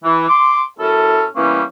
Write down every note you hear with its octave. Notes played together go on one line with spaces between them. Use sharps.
E3
C6 D6
F#2 C#4 E4 A4
E3 G3 A#3 B3 C#4